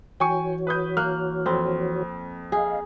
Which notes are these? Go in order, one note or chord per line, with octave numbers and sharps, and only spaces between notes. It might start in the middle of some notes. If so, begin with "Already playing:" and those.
E3 F#4 C#5 G5 G#5 C#6
B4 D#6 G6
A#3 F6 F#6
F2 C4
G#4 D#5 F5